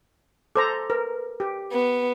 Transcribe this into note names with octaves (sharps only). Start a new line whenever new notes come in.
A4 C5 A#5 D6
A#4 B4
G4
B3